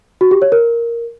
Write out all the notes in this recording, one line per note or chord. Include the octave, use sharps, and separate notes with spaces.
F#4
G4
C#5
A#4